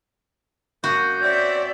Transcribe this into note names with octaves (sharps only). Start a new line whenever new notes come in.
F#2 A#3 F#4 G6
C4 C#4 D5 E5